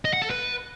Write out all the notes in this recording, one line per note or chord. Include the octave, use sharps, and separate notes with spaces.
D#5
F#5
A4
B4